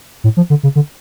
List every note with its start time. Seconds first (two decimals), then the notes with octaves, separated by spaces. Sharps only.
0.24 A2
0.37 F3
0.50 D3
0.63 C#3
0.76 D3